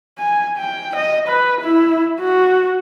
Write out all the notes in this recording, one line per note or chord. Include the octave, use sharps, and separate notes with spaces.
G#5
G5
D#5
B4
E4
F#4